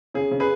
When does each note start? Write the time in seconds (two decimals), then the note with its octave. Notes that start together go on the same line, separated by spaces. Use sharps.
0.14 C#3 G#4
0.31 C#3
0.40 G#4 B4